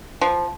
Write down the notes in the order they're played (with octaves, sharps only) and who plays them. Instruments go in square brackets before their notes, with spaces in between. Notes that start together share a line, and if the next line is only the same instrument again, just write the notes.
[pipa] F3